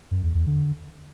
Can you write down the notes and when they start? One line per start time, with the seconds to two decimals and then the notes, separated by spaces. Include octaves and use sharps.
0.11 F#2
0.23 E2
0.35 E2
0.47 D3